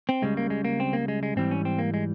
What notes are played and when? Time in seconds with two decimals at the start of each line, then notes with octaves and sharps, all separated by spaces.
0.09 C4
0.22 C#2 C#3 G3 G#3
0.37 A#3
0.50 G#3
0.65 A#3
0.80 C4
0.93 A#3
1.08 G#3
1.23 G#3
1.36 G#2 E3 G3 C4
1.51 C#4
1.65 C4
1.79 A#3
1.94 G#3